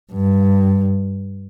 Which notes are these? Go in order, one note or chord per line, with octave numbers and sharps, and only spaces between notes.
G2